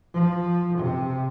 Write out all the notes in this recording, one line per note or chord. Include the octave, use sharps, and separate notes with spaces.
F3
C3